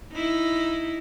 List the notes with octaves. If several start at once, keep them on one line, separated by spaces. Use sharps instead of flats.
D#4 E4